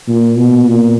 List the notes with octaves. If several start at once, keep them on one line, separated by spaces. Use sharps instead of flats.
A#2
B2
A#2